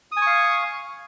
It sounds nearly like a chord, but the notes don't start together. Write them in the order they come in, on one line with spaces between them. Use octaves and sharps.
D#6 G#5 C#6 F5